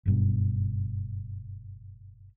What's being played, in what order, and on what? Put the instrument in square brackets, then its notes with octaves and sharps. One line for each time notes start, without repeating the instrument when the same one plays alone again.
[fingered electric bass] F#1 G2 B2